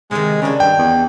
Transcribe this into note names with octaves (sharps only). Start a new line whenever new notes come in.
C3 D#3 G#3
C#3 D4 D#4
G2 G5
E2